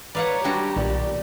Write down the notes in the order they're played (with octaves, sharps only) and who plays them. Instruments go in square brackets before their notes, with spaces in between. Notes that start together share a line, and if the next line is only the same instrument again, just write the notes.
[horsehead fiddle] B4 C#5 [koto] D5 F5 F#5 [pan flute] A#5
[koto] G3 D4 F#4 [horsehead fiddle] G4
[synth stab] B1 A#2 D#3 [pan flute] D5